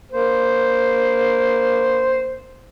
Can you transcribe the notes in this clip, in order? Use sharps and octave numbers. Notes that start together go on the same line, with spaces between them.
A#3 C5